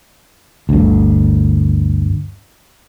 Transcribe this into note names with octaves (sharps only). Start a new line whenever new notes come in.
G1 D2